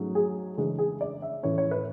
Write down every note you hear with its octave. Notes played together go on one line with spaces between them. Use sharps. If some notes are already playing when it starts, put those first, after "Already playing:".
Already playing: G#2 F#3 A3 C#4
G#4
C#3 E3 G#3 D4 G#4
G#4
D5
E5
A2 E3 A3 C#4 C#5
C#5
B4